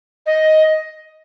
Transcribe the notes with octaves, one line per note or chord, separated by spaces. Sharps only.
D#5